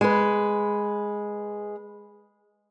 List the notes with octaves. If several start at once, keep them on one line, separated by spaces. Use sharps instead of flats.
G#3 B4